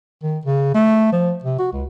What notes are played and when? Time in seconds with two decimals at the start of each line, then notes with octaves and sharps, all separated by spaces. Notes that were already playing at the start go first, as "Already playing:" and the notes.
0.23 D#3
0.46 C#3
0.74 A3
1.12 F3
1.44 C3
1.59 F#4
1.73 C#2